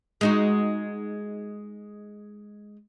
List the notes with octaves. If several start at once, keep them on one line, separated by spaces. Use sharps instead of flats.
G#3 D#4 F#4